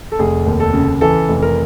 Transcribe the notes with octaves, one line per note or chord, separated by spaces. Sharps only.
A4
F1 G#4
D#2
A4
C#3
E3 A4
F1
A#4